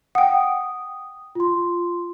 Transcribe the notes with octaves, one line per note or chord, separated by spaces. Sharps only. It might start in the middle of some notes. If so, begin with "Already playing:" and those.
F#5 G5 D#6
F4 C6